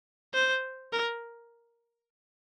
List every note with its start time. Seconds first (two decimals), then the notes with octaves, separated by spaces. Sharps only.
0.34 C5
0.93 A#4